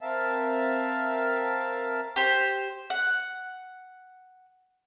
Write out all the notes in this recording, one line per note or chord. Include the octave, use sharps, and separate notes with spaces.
C4 A#4 E5 F5 A5
G4 C5
F#5